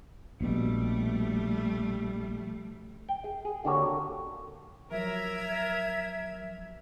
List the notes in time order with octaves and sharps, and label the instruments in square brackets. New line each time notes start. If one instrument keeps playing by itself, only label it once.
[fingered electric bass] A#1 B2 [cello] G3 A3
[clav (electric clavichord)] G5
G#4
G#4
D3 A#3 F#4 G4 A4 C#5
[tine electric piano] F3 F#3 [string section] A#4 [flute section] E5 G#6